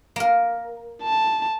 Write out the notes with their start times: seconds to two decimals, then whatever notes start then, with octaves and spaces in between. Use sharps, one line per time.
0.16 A#3 A#4
1.03 A5